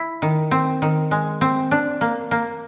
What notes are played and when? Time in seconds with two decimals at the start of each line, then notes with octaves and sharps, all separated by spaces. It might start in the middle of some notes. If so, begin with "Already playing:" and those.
Already playing: E4
0.22 D#3
0.51 C4
0.82 D#3
1.11 G#3
1.41 C4
1.71 D4
2.01 A#3
2.31 A#3